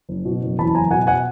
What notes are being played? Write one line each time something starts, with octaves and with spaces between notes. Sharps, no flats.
F#1
B2
F#1
E2 A5 B5
F#1 G#5 A#5
B2 F#5 G#5
F#5 G#5